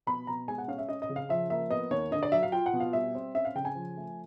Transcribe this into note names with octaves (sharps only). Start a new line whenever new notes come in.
B2 B5
B2 A#5
G#3 G#5
F#5
C#4 F5
E5
C#4 D#5
D#5
C#3
F5
F3 E5
A#3 E5
B3 D#5
D#2 C#5
D3 D#5
D5
F#3 E5
F5
F4 G5
F#5
B2
F5
G3 E5
C4
C#4 E5
F5
C#3 G5
G#5
F3
A3